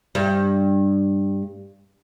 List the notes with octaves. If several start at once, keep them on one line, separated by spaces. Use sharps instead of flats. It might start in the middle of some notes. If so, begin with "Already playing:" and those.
G2 G3